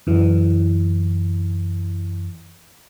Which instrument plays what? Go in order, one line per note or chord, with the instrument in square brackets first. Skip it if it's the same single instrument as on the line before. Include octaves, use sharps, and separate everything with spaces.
[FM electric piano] F#2 E3